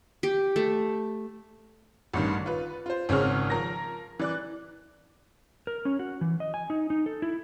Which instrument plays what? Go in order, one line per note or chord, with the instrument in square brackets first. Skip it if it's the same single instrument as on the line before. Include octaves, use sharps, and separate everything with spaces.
[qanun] G4
A3
[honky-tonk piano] A1 G2 D#3
F4 B4
F4 C5
G#1 C#3 C4 G#4 C#5 F6
F3 A#4 A#6
E3 D5 F#6
[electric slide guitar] A#4
C#4
F#4
E3
D#5
G#5
D#4
D#4
A4
E4